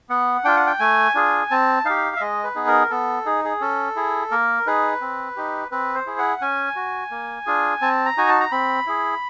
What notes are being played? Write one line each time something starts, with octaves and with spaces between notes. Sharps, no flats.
B3 F#5
D4 F4 G5
F#5
G5
A3 G#5
D4 F4 G#4
C4 A5
D#4 G4 F5
E5
G#3 D#5
B4
B3 D#4 G#4
A#4
B3 A4
D#4 G#4
G#4
C#4 A4
E4 G#4
A#3 A#4
D#4 G#4 B4
C4
D#4 G4
C4 B4
C5
E4 G#4
F#5
C#4 G#5
F#4
A#3
D4 F4 G#4
C4 A5
A#5
D#4 F#4 G#5
A5
A#5
C4 B5
E4 G#4